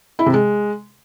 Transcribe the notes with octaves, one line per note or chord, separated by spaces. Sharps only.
E4
C3
G#3